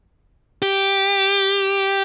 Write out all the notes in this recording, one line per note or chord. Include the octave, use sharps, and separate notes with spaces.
G4